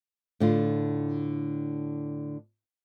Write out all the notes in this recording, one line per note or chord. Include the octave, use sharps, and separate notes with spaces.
A2 D3 F4